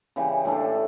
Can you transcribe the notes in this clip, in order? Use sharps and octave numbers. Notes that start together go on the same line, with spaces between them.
C#3 E3 G3
A2 G3 D4 A4